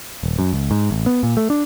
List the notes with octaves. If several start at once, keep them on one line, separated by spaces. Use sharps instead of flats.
D#1
F#2
C#2
G#2
A1
B3
A#2
A3
D4